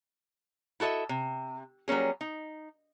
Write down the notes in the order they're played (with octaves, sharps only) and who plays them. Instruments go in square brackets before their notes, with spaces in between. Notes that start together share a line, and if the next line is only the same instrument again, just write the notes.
[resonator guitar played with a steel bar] E4 F#4 A4 D#5 E5
C3
F#3 G3 A#3 C#4 G#4
D#4